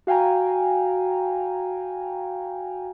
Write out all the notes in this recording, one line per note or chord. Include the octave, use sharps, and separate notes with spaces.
F#4 F5 G5 G#5 A#5